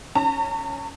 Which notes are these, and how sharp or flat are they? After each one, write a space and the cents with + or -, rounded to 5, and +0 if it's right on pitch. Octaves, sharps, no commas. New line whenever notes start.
C#4 +0 A#5 -45